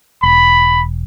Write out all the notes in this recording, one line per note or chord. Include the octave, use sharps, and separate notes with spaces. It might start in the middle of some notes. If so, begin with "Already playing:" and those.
E1 B5